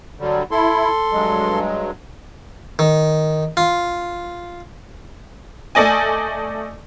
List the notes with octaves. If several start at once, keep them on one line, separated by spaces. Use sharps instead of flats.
D3 F#3 G3
E4 A4 C6
G2 F#3 G#3
D#3
F4
A3 A4 D5 D#5 G#5